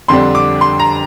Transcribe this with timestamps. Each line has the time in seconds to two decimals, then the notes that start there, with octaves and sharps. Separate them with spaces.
0.08 F2 D3 G3 D4 C6
0.35 D6
0.61 C6
0.79 A#5